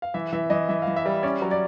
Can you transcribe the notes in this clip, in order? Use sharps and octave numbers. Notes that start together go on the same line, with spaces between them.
F5
E3 E5
E3 E5
E3 D#5
E3 E5
F5
E3
E5
G3
C#4 D5
F#3
D5